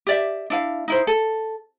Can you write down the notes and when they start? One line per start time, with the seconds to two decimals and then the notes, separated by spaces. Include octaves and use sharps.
0.07 G4 D5 E5
0.50 D4 E4 F5
0.88 D#4 E4 C5
1.07 A4